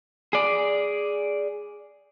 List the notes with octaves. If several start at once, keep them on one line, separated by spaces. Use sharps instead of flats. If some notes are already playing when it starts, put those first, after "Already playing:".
G#4 D5